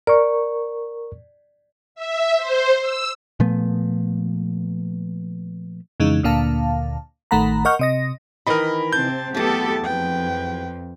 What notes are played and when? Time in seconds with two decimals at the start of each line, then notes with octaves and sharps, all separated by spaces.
0.07 A#4 D5 C#6
1.95 E5
2.37 C5
2.80 E6
3.40 A#2 F3 A3 B3
6.00 F2 C#3 E3 G#3 D#4
6.23 D2 A#2 D3 A#3 F5 A5
7.31 A1 D#3 A3 F#5 A#5 B5
7.65 A#4 D#5 F#5 C#6 F6 G6
7.79 C3 D#5 A#6
8.47 D#3 E3 A#4 D#5 B5
8.93 C3 C4 A5 G6
9.35 E2 F#3 A3 B3 G4 A4 A5
9.84 F2 B4 G5